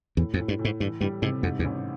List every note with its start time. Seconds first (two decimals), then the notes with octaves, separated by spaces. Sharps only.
0.17 E2 A2
0.34 F2
0.39 A2
0.48 G2
0.59 A2
0.65 G#2
0.80 G2 E3
1.01 G2 G3
1.22 G#2 C3
1.42 F2 G#2
1.59 E2
1.64 A1